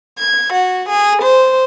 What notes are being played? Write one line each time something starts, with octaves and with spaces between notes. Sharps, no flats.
G#6
F#4
G#4
C5